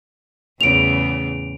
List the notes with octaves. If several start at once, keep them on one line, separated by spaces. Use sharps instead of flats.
E2 A2 C#3 D7 F7